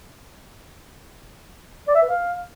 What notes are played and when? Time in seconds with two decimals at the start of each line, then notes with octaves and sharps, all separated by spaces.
1.88 D5
1.95 E5
2.02 B4
2.09 F5